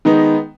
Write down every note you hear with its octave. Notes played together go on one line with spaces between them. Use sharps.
D#3 G#3 B3 D#4